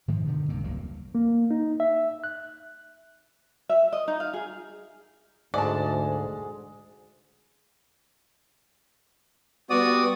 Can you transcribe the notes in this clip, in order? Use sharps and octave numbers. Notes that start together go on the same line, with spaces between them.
G#2 D#3 F3 G#3
G2 B2 D3 D#3
C2 G2 A#3 C4
E1 C#2 F#3 A#3
A#3
D#4
E5
F#6
E5
D#5
D#4
F5
G#4
D2 G#2 G#3 D5 A5
G3 B3 F#4 D5 D#6